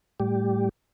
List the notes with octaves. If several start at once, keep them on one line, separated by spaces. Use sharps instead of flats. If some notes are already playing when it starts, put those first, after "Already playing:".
A2 G3 G4